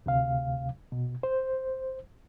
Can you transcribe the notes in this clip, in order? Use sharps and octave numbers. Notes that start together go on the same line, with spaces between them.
D2 C3 F5
B2
C5